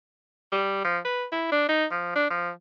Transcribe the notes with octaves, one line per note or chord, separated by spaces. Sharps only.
G3
F3
B4
E4
D4
D#4
F3
D4
F3